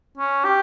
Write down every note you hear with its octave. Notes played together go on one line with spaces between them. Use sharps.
C#4
G4